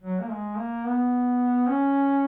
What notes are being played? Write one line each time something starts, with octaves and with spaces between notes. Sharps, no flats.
F#3
A#3
G#3
A#3
B3
C#4